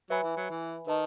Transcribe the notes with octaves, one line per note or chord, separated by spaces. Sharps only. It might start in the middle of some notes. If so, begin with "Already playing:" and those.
F#3 B4 E5 G#5 B5
E3
F#3
E3
D#3 B4 D#5 A5